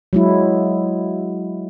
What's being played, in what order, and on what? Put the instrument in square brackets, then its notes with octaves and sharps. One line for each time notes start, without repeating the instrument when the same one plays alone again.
[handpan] F#3 G#3 E4